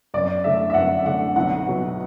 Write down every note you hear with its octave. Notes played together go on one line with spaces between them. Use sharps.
F#2 D5
D3 A3 E5
E5
F#2 F#5
D3 A3 F#5
B1 F#5
B2 F#3